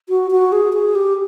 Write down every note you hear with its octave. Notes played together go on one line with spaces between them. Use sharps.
F#4
F#4
G#4
G#4
G4